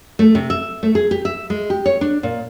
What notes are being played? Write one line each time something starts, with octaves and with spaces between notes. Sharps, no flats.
A3
C3
E5
A3
G#4
G4
E5
G#3
G4
C#5
D4
A#2